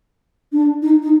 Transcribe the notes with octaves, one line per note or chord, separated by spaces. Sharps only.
D4
D#4
D#4